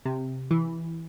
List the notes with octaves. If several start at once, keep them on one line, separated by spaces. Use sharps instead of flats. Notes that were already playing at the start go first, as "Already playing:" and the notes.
C3
E3